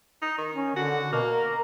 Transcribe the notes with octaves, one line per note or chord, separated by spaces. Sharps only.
D#4
D#3
C#4
D3 F#4
B2 A#3
A#4